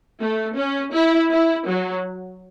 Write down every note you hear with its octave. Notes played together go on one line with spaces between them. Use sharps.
A3
C#4
E4
E4
F#3